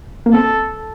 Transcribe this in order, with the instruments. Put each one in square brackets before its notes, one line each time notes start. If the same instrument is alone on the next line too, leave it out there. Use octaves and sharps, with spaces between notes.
[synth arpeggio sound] A#3
[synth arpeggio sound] C4 [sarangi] A4